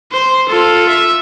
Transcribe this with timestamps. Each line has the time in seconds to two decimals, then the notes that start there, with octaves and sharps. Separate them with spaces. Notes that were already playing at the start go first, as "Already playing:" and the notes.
0.12 C5
0.49 F4 A4
0.89 E5